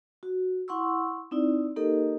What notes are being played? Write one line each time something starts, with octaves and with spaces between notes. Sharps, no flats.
F#4
E4 F#5 C6 C#6 E6
C4 D#4 E4 D5
A#3 D#4 G4 A4 A#4 D#5